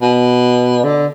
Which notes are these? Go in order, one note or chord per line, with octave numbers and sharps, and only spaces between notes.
B2
D3